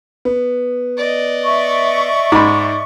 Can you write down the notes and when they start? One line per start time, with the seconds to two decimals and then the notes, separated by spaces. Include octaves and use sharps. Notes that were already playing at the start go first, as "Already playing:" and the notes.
0.25 B3
0.97 D5 D#5
1.43 E5 C#6
2.32 G#2 B5 D6